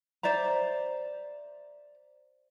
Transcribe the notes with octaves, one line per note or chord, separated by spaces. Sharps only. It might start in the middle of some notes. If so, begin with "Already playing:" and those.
C5 D5 E5 A#5